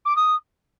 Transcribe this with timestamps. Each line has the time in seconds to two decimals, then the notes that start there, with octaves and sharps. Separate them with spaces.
0.05 D6
0.16 D#6